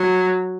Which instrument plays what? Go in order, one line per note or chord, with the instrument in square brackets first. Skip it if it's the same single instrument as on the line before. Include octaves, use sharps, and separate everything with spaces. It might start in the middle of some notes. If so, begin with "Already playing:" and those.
Already playing: [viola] F#3